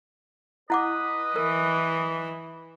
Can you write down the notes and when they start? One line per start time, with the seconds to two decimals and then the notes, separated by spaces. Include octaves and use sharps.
0.70 E4 B4 D#5 F#5 D6
1.36 E3 A#4